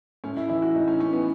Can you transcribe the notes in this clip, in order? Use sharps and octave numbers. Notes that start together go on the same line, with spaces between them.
A2 C#4
E4
E3 E4
F#4
A2 D#4
C#4
E3 C#4
B3